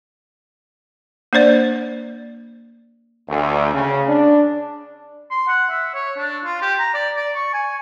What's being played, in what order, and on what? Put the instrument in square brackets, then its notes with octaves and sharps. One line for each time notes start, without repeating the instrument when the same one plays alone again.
[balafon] A#3 D4 C5 D5
[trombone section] D2
C#3
D4
[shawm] C6
F#5
E5
C#5
D4
F4
G4
A#5
D5
D5
C#6
G#5